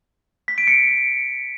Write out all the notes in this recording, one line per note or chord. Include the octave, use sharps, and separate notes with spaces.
B6
D7
C#7